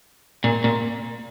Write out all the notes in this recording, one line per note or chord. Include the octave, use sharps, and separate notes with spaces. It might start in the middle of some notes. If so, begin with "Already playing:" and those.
A#2
A#2